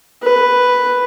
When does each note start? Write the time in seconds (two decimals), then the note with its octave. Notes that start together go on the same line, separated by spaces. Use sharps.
0.23 B4